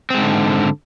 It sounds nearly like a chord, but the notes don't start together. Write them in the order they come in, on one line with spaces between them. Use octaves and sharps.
C4 G#3 G#2 D3